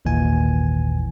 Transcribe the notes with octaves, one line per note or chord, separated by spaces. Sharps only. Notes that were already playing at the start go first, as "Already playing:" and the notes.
G#1 D#2 A#2 E3 G#5